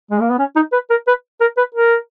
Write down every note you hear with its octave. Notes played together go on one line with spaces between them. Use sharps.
G#3
A#3
B3
C#4
D#4
B4
A#4
B4
A#4
B4
A#4